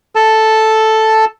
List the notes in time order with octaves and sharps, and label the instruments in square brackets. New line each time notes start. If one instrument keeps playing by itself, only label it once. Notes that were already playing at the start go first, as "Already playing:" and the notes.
[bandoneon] A4 A5